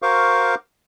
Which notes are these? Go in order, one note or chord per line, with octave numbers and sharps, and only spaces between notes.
F#4 A#4 C5 F5 C#6 D6